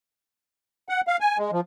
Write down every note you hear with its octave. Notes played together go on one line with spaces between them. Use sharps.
F#5
F5
G#5
G#3
F3